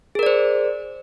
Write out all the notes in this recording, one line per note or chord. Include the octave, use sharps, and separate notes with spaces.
G#4 A#4 C5 D5